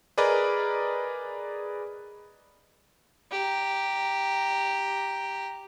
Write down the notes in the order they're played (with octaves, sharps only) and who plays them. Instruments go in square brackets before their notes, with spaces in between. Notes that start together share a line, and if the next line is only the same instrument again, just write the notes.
[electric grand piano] G#4 A#4 B4 D5 D#5
[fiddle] G4 A#5